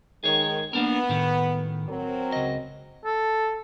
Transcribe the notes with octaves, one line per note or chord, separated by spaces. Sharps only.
D#3 G#3 G#4 C#5
A#3 B3 D4 A#4
A2 D#3
F#3 C4 A#4
C#2 D#5
A4